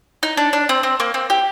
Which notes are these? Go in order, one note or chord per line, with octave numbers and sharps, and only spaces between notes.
D#4
D4
D4
C4
C4
A#3
C4
G4